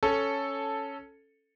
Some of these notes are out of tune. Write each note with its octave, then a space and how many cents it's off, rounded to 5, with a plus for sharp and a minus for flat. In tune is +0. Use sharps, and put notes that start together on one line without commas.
C#4 +0 A4 +0